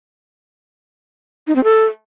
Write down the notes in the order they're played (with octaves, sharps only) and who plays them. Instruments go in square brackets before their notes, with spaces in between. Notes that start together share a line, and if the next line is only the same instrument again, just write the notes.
[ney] D#4
C4
A4